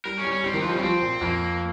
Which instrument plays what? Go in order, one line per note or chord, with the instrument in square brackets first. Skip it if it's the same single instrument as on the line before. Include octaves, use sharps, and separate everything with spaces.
[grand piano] G3 [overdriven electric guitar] A#4
[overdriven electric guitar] C#4
[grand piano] G3
[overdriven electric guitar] C#4
[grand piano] G3 [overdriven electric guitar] C4
[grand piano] D#3 [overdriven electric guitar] G4
[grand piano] F3 [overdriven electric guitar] F4
[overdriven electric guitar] D#4
[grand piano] G3 [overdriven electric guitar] C#4
[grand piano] F3 [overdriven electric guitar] C4
[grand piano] A#2
[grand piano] F2 [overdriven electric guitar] A#3